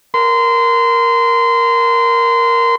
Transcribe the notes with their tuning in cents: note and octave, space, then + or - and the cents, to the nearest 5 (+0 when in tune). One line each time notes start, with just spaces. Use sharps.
A#4 +0 C6 -25